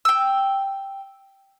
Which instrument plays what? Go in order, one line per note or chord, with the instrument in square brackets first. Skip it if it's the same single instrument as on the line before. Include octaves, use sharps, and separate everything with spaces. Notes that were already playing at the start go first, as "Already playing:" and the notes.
[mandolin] G5 E6